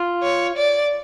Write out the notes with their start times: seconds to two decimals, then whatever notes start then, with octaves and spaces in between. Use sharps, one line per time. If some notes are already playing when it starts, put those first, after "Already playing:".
Already playing: F4
0.22 C#5
0.57 D5